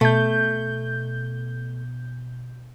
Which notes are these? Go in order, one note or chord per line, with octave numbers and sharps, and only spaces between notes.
B2 A3 G6